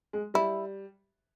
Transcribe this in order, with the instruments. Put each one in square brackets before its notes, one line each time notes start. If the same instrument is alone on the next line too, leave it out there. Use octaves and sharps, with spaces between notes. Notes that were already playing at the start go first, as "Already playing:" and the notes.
[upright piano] G#3
[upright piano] G3 [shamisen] E4